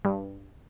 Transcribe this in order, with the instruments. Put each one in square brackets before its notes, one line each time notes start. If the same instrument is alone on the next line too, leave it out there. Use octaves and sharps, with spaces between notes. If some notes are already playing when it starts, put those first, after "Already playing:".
[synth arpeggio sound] G2